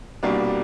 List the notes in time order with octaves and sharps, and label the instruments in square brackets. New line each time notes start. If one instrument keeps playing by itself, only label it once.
[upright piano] C2 B2 G3 A#3 D4